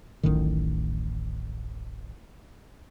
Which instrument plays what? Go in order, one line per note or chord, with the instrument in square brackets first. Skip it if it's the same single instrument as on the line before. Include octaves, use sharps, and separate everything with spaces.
[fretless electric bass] D1 A1 A2 D#3